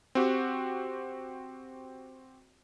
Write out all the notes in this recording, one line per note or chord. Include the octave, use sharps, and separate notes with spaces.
C4 F#4 G4